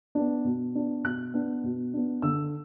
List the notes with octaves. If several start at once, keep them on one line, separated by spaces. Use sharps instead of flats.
B3 D4
B2
B3 D4
B2 F#6
B3 D4
B2
B3 D4
D3 E6